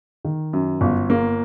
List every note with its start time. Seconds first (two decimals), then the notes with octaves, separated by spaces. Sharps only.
0.25 D#3
0.53 F#2
0.81 G1
1.10 A#3